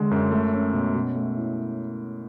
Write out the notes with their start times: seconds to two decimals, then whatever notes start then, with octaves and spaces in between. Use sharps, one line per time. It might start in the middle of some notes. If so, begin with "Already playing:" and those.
Already playing: D3 G#3
0.11 F#2
0.31 A3
0.53 C#4
0.73 B2
0.95 B2
1.16 A3
1.37 E4